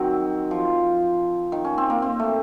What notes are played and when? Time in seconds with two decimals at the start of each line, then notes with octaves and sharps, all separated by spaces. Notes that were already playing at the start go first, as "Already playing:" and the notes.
Already playing: D#3 F#3 C4
0.51 F3
1.52 D#3
1.65 C#4
1.78 C4
1.90 A#3
2.02 C4
2.19 A3